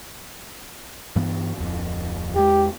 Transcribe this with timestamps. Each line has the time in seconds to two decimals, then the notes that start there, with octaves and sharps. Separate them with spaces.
1.16 G2 E3 B3
1.58 D1 F2
2.36 E2 G#3 G4